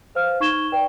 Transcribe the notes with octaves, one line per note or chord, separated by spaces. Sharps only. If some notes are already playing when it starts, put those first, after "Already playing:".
B4 C5 F5 F6
D#4 C#6 G#6 E7 G7
B4 D5 G5